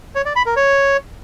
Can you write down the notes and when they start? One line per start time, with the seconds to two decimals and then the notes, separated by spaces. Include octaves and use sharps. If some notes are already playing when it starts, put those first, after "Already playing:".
0.15 C#5
0.26 D5
0.36 B5
0.46 A#4
0.56 C#5